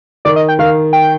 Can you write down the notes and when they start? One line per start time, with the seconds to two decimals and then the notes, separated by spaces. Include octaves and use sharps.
0.25 D#3 D5
0.36 D#5
0.48 G5
0.59 D#3 F5
0.93 G5